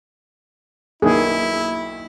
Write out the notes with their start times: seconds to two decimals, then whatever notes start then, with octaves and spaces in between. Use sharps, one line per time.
1.02 B1 D#3 A#3 E4 G#4